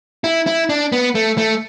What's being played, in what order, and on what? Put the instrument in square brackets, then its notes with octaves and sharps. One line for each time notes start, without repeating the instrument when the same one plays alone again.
[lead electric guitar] E4
E4
D4
B3
A3
A3